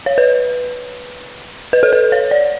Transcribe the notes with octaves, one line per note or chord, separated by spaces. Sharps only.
C#5
B4
B4
A4
B4
C#5
D5